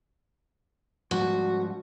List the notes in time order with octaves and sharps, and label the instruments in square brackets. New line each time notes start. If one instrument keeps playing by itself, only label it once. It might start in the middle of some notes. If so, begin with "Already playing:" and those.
[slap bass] G#2 F3 G3 [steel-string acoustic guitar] F#4